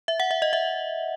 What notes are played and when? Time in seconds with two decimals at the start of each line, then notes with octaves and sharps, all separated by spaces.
0.08 E5
0.20 F#5
0.31 E5
0.42 D#5
0.53 E5